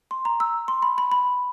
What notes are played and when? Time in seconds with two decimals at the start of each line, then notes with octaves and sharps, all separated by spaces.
0.11 C6
0.25 A#5
0.40 E6
0.68 C6
0.82 B5
0.98 B5
1.12 B5